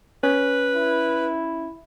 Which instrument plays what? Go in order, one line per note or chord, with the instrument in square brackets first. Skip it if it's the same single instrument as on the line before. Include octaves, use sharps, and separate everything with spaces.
[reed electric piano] C#4 [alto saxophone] B4
[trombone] E4